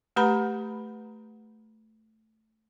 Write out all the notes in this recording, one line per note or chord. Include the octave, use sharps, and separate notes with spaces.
A3 G4 B4 A#5 B5